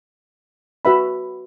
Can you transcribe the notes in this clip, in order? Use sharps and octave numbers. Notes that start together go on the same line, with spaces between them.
F#4 B4 E5 B5